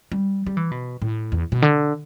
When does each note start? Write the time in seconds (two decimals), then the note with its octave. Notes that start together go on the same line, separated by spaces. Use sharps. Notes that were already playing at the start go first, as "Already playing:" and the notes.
0.12 G3
0.46 G3
0.57 E3
0.71 B2
1.02 A2
1.32 E2
1.52 B2
1.62 D3